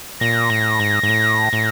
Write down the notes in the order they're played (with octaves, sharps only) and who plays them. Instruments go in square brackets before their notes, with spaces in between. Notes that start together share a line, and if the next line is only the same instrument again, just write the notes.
[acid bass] A#2 [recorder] A#6
[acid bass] A2
G#2
G#2
A2
A2